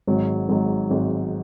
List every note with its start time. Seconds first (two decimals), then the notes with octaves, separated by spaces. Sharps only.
0.07 G#1 G#2 F#3
0.49 G#1 G#2 F#3
0.91 G#1 G#2 F#3